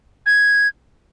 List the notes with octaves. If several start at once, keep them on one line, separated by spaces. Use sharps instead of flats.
G#6